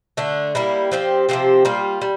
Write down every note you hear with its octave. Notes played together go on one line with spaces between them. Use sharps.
D3 A3 D4
G3 A#3 E4
F3 C4 G4
C3 F3 C4 G4
G3 A#3 F4
G3